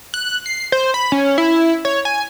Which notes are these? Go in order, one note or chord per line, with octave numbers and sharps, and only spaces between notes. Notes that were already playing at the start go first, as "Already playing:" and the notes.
F#6
C7
C5
B5
C#4
E4
C#5
G#5